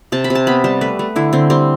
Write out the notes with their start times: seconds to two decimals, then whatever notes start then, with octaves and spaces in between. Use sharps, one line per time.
0.12 C3 A5
0.24 B5
0.30 C3
0.35 A5
0.47 B3 B5
0.64 G3 A5
0.81 A3 B4
0.99 A3
1.16 D3 E4
1.33 D3 C4
1.50 G3 C4